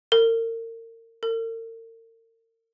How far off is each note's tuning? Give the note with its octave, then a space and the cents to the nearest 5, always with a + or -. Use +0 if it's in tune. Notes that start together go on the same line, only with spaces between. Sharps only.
A#4 -35
A#4 -45